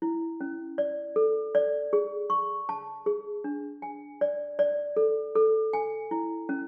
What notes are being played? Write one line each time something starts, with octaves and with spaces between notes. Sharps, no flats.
E4
C#4
D5
A4
D5
G#4
C#6
A5
G#4
D4
G#5
D5
D5
A4
A4
G#5
E4
C#4